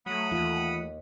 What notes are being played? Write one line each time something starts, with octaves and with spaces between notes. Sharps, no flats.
F#3 A3 F#5 B5 D#6
D#2 E3 F4